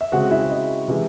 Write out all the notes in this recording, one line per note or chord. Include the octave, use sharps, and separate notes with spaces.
E5
C#3 G#3 C4 F#4 F#5
E4 E5
D#5
C3 E3 G#3